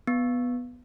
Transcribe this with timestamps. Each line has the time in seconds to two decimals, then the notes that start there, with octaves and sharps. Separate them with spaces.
0.07 B3